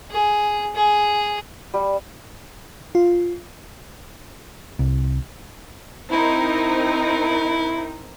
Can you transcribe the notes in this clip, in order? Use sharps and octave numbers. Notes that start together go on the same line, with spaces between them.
G#4
G#4
G3
F4
C2
C4 D#4 E4 A#4